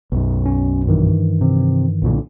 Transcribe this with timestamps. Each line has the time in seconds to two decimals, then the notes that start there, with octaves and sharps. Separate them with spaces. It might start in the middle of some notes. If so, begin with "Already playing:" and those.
0.12 B1 F#2
0.46 C#4
0.87 G2 D#3 E3
1.41 C3
2.02 B1 A#2 D3